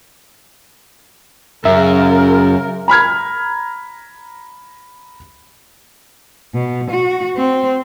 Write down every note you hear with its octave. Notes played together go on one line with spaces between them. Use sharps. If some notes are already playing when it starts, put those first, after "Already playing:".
F#2 C#3 A#4 E5
A#5 B5 F6 G#6
B2
F#4
C4